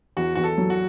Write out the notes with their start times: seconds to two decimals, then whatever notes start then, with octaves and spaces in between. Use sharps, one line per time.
0.17 E2 F#4
0.35 E2 F#4
0.44 A4
0.58 F#3
0.70 F#4